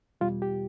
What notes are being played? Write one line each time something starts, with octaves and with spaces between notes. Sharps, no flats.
E2 B2 G3 F4
G4